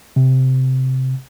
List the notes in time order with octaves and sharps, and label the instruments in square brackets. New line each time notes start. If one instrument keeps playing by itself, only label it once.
[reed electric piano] C3